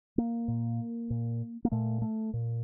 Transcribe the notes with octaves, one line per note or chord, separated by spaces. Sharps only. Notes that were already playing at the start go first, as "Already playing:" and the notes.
A#3
A#2
A#2
A#3
A#2 A3
A3
A#2